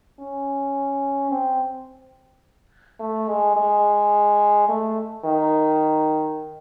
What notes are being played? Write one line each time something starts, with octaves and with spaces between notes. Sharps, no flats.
C#4
C4
A3
G#3
G#3
A3
D#3